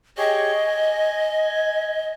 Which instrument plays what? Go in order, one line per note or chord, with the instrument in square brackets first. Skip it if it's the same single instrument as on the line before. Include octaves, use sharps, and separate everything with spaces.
[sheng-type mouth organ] G4 G#4 C#5 [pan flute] D#5
[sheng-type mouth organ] G#5